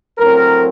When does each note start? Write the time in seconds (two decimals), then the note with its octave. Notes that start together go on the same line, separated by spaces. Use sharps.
0.18 A2 F#3 C4 A#4